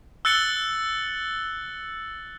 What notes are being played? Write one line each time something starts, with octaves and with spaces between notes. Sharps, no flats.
E6 F#6 A6 C#7 F#7 G7